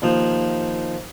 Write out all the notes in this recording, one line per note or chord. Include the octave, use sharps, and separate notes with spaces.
D#2 F3